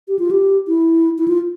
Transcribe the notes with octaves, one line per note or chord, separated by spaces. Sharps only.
G4
F4
G4
E4
E4
F4